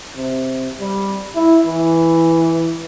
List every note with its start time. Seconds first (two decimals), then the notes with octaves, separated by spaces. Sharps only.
0.16 C3
0.80 G3
1.35 E4
1.66 E3